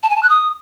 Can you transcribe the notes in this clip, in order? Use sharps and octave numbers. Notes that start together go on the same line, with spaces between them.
A5
G#5
A5
F#6
D#6